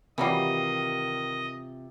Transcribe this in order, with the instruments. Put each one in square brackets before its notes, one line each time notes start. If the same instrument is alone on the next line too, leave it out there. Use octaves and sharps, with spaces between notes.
[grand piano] C3 F4 C7 [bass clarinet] D#3 [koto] E3 F#3 G3 [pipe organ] D#5